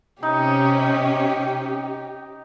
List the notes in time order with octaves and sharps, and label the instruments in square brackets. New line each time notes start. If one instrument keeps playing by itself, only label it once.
[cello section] C3 C#4 [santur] D#4 [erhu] G4